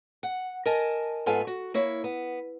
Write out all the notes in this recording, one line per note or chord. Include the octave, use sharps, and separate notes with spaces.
F#5
A#4 D#5 G#5 A5
G#2 B3 F4 A4 F5 G#5
F#4
A#3 E4 C#5
B3